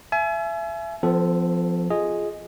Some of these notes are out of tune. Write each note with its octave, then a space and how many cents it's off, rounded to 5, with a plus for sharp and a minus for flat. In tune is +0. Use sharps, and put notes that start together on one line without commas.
E5 +30 G#5 +35
F3 +0 C4 -45 A4 +0
F4 +0 G#4 +0 D#5 +0